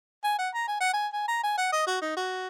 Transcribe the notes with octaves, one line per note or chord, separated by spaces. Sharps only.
G#5
F#5
A#5
G#5
F#5
G#5
G#5
A#5
G#5
F#5
D#5
F#4
D#4
F#4